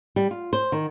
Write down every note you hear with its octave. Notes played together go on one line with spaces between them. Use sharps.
G3
F4
C5
D#3